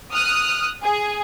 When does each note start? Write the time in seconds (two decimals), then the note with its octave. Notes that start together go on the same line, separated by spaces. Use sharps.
0.12 D#6 F6 F#6
0.83 G#4